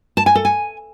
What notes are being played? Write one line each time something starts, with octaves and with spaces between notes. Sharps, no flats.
A5
G#5
A4
G#5